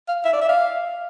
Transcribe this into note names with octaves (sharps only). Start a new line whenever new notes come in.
F5
E5
D5
E5
F5